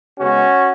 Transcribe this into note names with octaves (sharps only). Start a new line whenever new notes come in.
C#3 G#3 B3 C#4 F#4